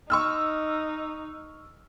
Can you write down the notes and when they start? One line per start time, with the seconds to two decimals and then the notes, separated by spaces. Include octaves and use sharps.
0.10 D#4 C#6 E6 F6